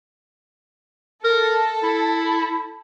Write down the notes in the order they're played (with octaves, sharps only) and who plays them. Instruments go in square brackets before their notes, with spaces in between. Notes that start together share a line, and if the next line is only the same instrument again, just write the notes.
[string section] A4 [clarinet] A#4
[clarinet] E4